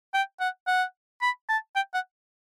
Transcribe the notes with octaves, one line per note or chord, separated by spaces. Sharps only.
G5
F#5
F#5
B5
A5
G5
F#5